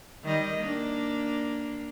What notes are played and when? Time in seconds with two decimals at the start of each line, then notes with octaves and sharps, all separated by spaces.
0.24 D#3 G3 D#5
0.57 A#3 D4